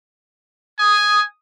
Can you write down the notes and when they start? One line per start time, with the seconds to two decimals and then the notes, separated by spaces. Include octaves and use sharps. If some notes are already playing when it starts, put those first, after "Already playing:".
0.79 G#5 D#6